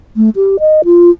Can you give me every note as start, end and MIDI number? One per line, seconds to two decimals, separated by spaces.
0.16 0.30 57
0.36 0.57 67
0.60 0.81 75
0.85 1.10 65